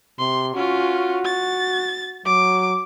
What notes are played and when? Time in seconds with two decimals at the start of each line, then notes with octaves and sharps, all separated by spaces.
0.19 C3 C6
0.55 C#4 F4 F#4
1.25 A6
2.26 F#3 D6